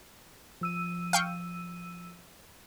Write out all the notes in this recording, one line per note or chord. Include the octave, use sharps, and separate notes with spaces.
F3 E6 D#7
F5 G5 C#6